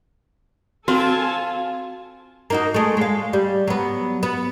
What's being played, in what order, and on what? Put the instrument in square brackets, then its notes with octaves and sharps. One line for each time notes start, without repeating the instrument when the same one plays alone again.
[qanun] C4 [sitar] F4 [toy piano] F#4 [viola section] A4 G#5 A5
[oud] A#3 D#4 F#4
G#3 A3
G#3 F5
G3
F#3 B3
B3